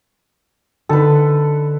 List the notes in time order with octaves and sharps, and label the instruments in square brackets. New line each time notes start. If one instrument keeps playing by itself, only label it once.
[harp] D3 D#4 A6 [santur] A4 B4